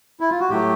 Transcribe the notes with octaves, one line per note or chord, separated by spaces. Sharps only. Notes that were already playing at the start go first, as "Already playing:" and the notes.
E4
F4
F#4
A2 F#3 A3 G4